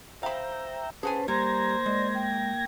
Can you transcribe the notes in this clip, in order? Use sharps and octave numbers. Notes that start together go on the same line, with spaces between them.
C5 E5 F5 G5 A#5 B5
C#4 G#4 B4 C5 F#5 G#5 A5
G3 A#3 C5 A#5 G#6 A#6
G#3 D5
G5